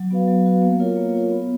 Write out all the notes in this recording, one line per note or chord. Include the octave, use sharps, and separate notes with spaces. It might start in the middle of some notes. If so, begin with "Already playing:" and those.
Already playing: F#3
B3 F#4 B4 F5
F#3
B3 F#4 B4 F5
A#3
F4 A#4 C#5
A#3
F4 A#4 C#5
B3